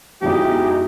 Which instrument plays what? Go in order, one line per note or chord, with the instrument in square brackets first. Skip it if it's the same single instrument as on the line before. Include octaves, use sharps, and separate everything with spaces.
[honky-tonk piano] F#2 B2 F3 [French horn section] G#3 E4 F#4 [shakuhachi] D#4 [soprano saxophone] G4